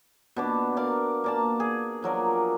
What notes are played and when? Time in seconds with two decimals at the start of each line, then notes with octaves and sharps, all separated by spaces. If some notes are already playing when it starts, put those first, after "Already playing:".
0.36 B2 D4 D5
0.76 A#4 D5 F5
1.24 A#3 D5 A5
1.60 G#4
2.02 F3 F#3 A#4 D5